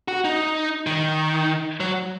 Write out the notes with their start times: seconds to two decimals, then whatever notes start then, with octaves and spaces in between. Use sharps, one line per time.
0.08 F#4
0.25 D#4
0.86 D#3
1.80 F#3